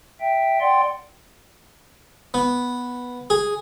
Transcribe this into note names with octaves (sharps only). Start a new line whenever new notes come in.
E5 G5
D5 F#5 G5 C6
B3
G#4